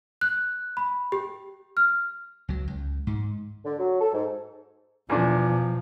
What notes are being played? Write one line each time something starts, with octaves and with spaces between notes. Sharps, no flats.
F#6
B5
G4
F6
C#2 F#3
C#2
G#2
D3
F#3
A4
G#2
E2 B2 F3 D4